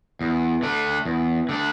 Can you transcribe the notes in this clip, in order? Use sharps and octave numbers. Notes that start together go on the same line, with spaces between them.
E2
D3 A3 D4
E2
D3 A3 D4